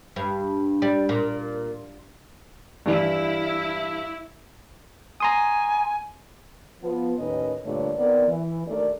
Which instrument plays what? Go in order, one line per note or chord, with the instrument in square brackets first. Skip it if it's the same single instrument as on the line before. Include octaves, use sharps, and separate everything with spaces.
[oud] G2
G3
A#2
[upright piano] G2 E3 [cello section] E4
[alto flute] G#5 [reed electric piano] A#5 C6 D#6
[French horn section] F3 B3 F4
D#2 A2 D#3 C#4 B4 D#5
G2 A#2 D3 A3 D4 C#5
D#3 B3 C4 A#4 D5
E3
D#2 A3 D4 A#4 D5